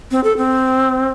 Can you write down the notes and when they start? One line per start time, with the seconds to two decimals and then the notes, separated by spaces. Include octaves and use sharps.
0.11 C4
0.24 A4
0.37 C4